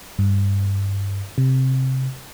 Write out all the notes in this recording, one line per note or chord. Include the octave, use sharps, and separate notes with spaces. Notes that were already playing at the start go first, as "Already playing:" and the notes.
G2
C3